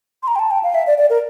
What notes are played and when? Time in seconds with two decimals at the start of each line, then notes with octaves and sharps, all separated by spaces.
0.23 C6
0.28 A#5
0.36 G5
0.39 A5
0.51 G5
0.63 F5
0.75 E5
0.87 D5
0.98 D5
1.10 A#4